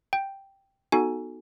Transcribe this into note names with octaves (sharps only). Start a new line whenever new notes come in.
G5
B3 D#4 F#4 A4 G#5